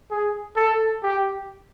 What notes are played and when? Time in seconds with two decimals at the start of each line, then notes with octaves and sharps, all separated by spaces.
0.11 G#4
0.56 A4
1.03 G4